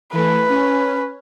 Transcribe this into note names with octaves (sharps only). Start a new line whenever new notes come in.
E3 A3 B4
C#4